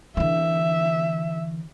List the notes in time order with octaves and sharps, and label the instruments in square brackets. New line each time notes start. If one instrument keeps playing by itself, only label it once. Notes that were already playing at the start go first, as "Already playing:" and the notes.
[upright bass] D3 E3 [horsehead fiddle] E5